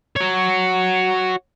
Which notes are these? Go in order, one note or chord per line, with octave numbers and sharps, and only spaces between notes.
F#4 C#5